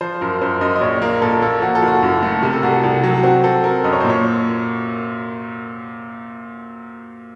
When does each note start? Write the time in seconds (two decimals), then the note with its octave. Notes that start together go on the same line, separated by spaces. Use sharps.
0.01 F3 C5
0.21 F#2 A#4
0.41 F#2 C5
0.61 F#2 D#5
0.75 D#5
0.81 A#1 C#5
1.02 A#3 A#4
1.22 A#2 A4
1.42 A#3 A4
1.62 F3 F#4
1.75 A4
1.82 F#1
1.87 F#4
2.03 F#2
2.23 A3
2.43 C3 A#4
2.53 A4
2.63 C2 F#4
2.73 A4
2.83 C2
3.04 F#3
3.23 C4 F#4
3.44 C4 A4
3.64 C4 A#4
3.84 F#2 D#5
3.92 C#5
4.01 C5
4.05 A#2 C#5